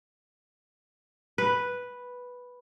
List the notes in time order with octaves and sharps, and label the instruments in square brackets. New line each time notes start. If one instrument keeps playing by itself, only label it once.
[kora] B4